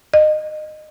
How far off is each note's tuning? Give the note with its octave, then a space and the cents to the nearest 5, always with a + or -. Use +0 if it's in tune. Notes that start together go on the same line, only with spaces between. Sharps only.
D#5 -25